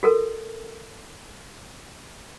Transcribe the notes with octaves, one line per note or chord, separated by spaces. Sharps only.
F#4 A4 A#4